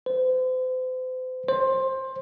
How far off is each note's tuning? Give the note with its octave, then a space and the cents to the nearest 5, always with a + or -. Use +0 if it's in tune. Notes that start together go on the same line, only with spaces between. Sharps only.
C5 -40
C5 +15